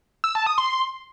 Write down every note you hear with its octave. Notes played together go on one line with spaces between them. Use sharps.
E6
A5
D#6
C6